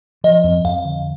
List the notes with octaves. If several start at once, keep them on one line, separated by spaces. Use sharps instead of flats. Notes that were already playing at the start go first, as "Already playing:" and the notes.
F3 D#5
F2
F2 F5
D3